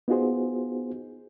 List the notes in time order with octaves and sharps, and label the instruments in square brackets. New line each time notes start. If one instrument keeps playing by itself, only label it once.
[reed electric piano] B3 D#4 F4 F#4 G#4 C5